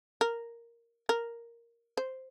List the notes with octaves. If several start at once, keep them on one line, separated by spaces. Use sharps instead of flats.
A#4
A#4
C5